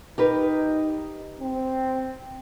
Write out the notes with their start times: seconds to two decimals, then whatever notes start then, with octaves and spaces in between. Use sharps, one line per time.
0.18 D#4 G4 A#4 B4
1.41 C4